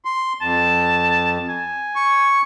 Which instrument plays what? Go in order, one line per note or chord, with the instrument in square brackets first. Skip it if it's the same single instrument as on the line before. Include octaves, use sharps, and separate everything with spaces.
[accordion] C6
[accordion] F2 [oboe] A5
[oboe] G#5
[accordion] C#6